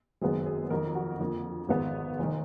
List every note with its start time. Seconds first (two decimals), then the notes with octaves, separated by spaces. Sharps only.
0.21 F#1 F#2 D#3 G#3 B3 G#4
0.46 G#4
0.70 F2 D#3 F#3 A#4
0.95 F#4
1.19 F2 D3 F3 A#3
1.69 G#1 G#2 D#3 G#3 B3
2.19 F1 D#3